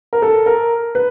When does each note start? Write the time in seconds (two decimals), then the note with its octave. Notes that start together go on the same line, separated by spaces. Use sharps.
0.13 A#4
0.22 A4
0.46 A#4
0.95 B4